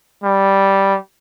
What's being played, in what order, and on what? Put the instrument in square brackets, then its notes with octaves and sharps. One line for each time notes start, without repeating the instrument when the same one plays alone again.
[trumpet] G3